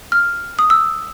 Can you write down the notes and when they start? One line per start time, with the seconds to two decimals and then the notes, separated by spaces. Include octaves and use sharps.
0.12 F6
0.59 D#6
0.70 E6